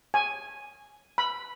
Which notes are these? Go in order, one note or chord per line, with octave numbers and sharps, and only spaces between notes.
G#5
B5